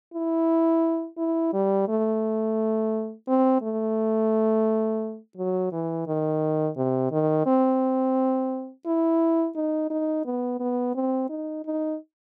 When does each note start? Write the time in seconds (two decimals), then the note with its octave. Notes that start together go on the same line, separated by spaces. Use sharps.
0.14 E4
1.18 E4
1.53 G3
1.88 A3
3.28 C4
3.62 A3
5.37 F#3
5.72 E3
6.07 D#3
6.77 C3
7.12 D#3
7.46 C4
8.86 E4
9.56 D#4
9.90 D#4
10.25 B3
10.60 B3
10.95 C4
11.30 D#4
11.65 D#4